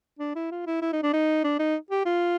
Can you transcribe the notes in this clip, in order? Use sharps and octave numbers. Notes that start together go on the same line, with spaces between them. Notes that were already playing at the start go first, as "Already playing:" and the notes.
D4
E4
F4
E4
E4
D#4
D4
D#4
D4
D#4
G4
F4